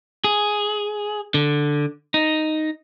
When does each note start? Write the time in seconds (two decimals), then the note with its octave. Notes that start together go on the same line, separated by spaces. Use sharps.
0.24 G#4
1.34 D3
2.14 D#4